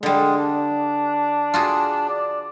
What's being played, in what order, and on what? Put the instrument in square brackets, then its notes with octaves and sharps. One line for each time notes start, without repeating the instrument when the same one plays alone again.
[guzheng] D3 G3 [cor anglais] G#3
[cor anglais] D4
[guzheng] F4 F#4 G#4
[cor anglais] D5